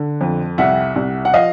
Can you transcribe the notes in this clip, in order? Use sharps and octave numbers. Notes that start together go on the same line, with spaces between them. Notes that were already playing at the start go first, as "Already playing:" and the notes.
Already playing: D3
F2
C2 E5 F#5
C2
F#5
F3 D#5 F5